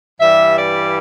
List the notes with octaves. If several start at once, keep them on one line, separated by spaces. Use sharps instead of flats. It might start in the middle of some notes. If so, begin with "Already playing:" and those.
G2 E3 G3 E5
D5